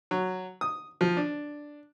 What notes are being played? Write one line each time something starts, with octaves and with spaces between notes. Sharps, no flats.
F#3
D#6
F3
D4